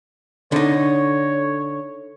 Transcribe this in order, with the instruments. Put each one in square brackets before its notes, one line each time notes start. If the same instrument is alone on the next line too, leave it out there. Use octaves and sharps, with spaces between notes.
[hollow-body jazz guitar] D3 D#4 [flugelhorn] C#5